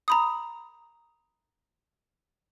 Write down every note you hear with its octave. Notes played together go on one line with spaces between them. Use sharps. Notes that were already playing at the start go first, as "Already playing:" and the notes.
A#5 B5 D#6